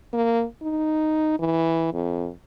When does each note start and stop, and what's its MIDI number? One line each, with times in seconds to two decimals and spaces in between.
0.13 0.44 58
0.63 1.38 63
1.39 1.89 52
1.93 2.30 41